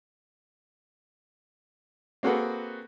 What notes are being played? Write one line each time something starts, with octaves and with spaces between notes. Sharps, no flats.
A#3 C4 F#4 G#4 A4 B4